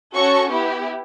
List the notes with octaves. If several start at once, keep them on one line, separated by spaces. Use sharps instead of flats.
C#4 F#4 A4 C#6
B3 E4 G4